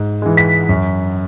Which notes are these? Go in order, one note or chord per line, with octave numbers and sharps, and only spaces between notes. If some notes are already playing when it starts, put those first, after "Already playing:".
Already playing: G#2
E3 G#3
B6
F#2